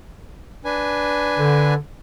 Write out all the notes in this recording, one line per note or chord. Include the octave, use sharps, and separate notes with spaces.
D4 B4 G#5
D3